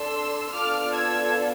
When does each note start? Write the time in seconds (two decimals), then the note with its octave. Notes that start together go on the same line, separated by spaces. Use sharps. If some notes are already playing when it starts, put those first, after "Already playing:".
Already playing: D4 A4 C6 E6
0.53 B3 D4 F4 A4 D6 F6
0.93 E6 G#6